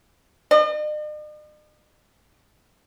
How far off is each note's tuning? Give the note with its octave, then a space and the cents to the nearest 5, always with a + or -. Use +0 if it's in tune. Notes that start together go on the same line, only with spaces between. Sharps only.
D#5 -45